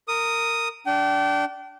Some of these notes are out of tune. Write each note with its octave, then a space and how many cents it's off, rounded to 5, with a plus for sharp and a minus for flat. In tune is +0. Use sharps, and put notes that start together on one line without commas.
A#4 -15 D#6 +0
D4 -15 G5 -35